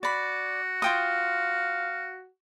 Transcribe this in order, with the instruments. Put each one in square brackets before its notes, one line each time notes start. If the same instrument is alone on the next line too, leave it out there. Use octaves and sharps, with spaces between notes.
[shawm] F#4 [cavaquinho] D5 B5
[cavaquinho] F4 G5 D#6 [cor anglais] F5